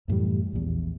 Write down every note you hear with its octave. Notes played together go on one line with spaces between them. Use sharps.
F#2 A2 E3 G3
A#1 E2